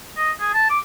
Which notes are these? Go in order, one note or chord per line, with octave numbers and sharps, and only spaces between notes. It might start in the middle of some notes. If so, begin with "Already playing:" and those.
D#5
G#4
A5
D6